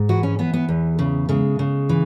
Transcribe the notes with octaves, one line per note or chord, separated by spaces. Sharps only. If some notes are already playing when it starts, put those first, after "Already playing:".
Already playing: G#2
E3 F#4
C#4
E3 B3
B3
E2
C#3
C#3 G#3
C#3
E3